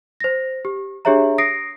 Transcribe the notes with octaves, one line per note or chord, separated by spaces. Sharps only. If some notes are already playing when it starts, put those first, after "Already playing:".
C5 A#6
G4
D4 G4 G#4 C#5 E5 A#5
D#6 A#6 C7 D7